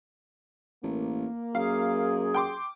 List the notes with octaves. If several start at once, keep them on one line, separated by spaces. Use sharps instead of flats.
A1 A#3
F#2 G#4 F5
G5 C6 D6